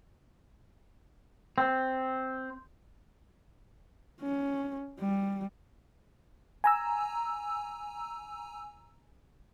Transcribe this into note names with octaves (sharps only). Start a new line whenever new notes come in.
C4
C#4
G3
G#5 A#5 E6